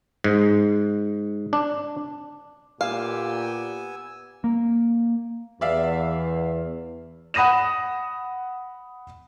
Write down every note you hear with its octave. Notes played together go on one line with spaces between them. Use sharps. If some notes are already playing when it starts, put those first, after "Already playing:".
G#2
D4
A#2 B3 G4 F5 G#5 E6
A#3
E2 D5 E5 F5
F#5 B5 D#6 A#6 D#7 E7